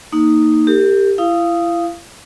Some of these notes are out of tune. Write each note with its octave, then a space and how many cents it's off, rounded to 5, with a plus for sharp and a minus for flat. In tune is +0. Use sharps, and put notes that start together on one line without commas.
A#3 -10 D#4 +0
G4 +10 A#4 -40
E4 +35 F5 -10 D#6 +0